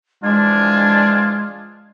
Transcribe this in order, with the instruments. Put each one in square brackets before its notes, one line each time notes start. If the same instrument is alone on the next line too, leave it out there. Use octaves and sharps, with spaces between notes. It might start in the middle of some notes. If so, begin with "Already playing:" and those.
[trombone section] E3 F3 D4 [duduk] G#3 [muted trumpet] F4 [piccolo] G#6